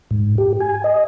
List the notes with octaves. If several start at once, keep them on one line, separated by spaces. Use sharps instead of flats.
G#2
G4
G#5
D#5